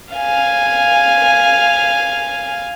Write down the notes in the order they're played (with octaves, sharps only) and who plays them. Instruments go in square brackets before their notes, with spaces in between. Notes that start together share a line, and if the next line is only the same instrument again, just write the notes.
[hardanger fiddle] F5 G#5